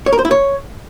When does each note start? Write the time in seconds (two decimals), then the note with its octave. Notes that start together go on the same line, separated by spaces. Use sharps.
0.06 C#5
0.13 A#4
0.19 C5
0.25 E4
0.31 C#5